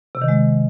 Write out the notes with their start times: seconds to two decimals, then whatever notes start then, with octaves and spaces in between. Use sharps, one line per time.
0.15 C3
0.22 D#3
0.28 G#3